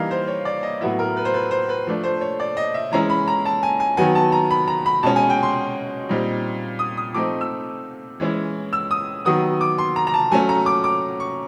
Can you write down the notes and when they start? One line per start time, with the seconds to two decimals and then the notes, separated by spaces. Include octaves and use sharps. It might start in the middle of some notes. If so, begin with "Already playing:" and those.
Already playing: E3 G3 A#3 D#4 F5
0.11 C5
0.28 C#5
0.45 D5
0.63 D#5
0.81 A2 F#3 B3 E4 E5
0.99 A#4
1.17 B4
1.25 C5
1.34 B4
1.51 C5
1.69 B4
1.87 F3 A3 D4
2.04 C5
2.21 C#5
2.40 D5
2.57 D#5
2.74 E5
2.91 E3 G#3 C#4 E4 A#5
3.10 B5
3.28 A#5
3.45 A5
3.63 G#5
3.80 G#5
3.97 D#3 F#3 B3 G#5
4.15 A5
4.32 A#5
4.51 B5
4.68 A#5
4.86 B5
5.03 B2 G#3 C#4 A5
5.16 G#5
5.30 G5
5.43 C6
6.09 A#2 G3 C4 D#4
6.79 D#6
6.97 D#6
7.14 F3 A3 C4 D#4 D6
7.41 E6
8.20 E3 G#3 C#4 E4
8.73 E6
8.91 D#6
9.25 D#3 F#3 B3 D#6
9.61 D6
9.78 C6
9.96 A#5
10.07 A#5
10.14 A5
10.31 F#3 A3 C#4 G#5
10.49 A#5
10.66 D6
10.84 D6
11.20 C#6